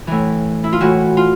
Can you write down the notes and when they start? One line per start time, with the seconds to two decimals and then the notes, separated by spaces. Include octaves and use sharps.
0.07 A2 E3
0.64 E4
0.72 F4
0.80 A2 E3 F#4
1.17 F4